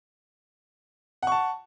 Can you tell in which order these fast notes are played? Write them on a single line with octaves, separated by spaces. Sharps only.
F#5 C#6 A5